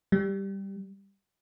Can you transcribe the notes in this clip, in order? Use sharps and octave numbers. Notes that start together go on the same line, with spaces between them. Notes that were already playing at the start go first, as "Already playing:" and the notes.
G3